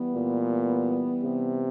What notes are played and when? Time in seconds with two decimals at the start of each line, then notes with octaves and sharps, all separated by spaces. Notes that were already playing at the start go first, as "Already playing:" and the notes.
Already playing: E3 G3 B3
0.15 A#2
1.24 C3